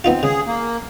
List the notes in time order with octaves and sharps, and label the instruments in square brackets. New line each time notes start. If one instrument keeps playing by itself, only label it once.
[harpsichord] B3 D#4 F4 [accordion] C4
[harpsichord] C#3 [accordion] G#4
[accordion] A#3